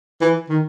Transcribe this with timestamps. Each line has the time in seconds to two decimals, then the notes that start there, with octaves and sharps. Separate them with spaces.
0.21 E3
0.49 D#3